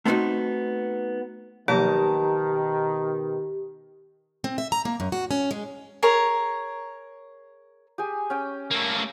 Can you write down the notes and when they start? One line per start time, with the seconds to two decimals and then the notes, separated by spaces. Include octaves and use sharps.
0.05 A3 B3 C4 D4 D#4 F#4
1.68 B2 D#3 F3 F#3 A#3 G4 A5 A#5
4.44 C4
4.58 E5
4.72 A#5
4.85 A#3
5.00 F#2
5.12 F#4
5.31 C#4
5.51 G#3
6.03 G#4 A#4 C#5
7.98 G4 G#4 G#5
8.30 C#4 G5
8.71 A3 A#3